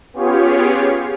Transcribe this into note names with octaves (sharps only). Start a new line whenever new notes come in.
B3 C#4 F4 G4 G#4 C#5